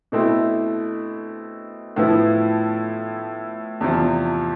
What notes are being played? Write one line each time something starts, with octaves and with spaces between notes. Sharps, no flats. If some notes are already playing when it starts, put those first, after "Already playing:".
B2 A3 C4 E4
A2 F3 B3 E4
E2 C3 F3